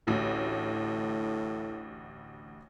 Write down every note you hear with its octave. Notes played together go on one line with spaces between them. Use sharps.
A1 D2 A2